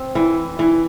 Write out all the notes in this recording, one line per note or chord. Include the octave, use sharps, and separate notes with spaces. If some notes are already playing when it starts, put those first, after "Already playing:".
Already playing: C4
E3
E3